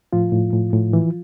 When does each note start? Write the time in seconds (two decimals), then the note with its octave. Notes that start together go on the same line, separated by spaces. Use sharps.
0.13 A2 F3 F4
0.33 A2
0.53 A2
0.73 A2
0.93 E3